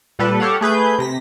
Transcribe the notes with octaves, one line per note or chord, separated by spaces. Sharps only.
A#2 G3 A4 B4
G4 A4 C#5 F5 F#5
A3 G#4 B4 G6
C3 A#6 B6